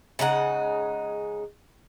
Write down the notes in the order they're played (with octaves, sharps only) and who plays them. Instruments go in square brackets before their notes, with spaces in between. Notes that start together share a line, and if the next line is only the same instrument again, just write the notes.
[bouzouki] C#3 G#3 D#4 F#5